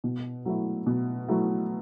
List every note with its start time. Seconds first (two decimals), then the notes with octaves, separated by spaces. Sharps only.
0.04 B2
0.45 F#3 A3 E4
0.87 B2
1.28 F#3 A3 E4